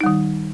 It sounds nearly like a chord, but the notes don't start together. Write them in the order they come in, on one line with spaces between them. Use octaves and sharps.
D#4 G3 D#3